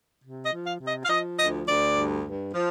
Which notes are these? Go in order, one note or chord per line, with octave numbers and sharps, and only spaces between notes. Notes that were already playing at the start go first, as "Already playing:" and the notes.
C3
D#5
F3
F5
C3
D#5
F5
F3 D#5
D2 D#5
D2 D5
G2
G2
F3